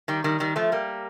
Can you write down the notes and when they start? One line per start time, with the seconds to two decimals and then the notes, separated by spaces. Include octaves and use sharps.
0.08 D#3 G3
0.24 D#3 G3
0.40 D#3 G3
0.56 F3 A3
0.72 G3 A#3